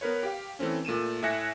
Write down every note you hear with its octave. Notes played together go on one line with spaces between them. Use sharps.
B3 A#4 B4 C#5
G4 F5
E3 A3 C4 C#4
A#2 A3 D#7 E7
A2 E5 G#5 F#6 A#6 C#7